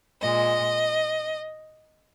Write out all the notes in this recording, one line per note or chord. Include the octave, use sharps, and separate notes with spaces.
A#2 G#3 D#5